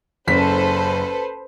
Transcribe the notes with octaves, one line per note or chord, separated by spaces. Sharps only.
F#1 A4 B4 C5 B6